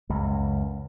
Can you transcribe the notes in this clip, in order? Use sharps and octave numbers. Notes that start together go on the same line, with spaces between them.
C#2 F#2